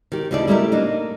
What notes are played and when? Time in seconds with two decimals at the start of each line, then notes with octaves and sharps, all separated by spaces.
0.12 D#3 G4
0.31 D2 C#3 D#4 E4 A4 D5
0.47 G3 A3 E4 F#4 G4 A#4
0.72 A#3 D4 D#4